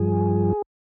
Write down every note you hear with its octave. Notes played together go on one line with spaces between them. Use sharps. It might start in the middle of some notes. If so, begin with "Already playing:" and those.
Already playing: G2 F3 G#4